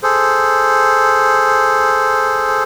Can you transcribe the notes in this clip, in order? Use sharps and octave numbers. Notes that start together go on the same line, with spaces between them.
G#4 A4 C5